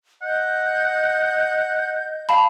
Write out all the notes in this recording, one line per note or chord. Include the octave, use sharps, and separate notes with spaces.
D#5 F#5 G6
F5 A5 B5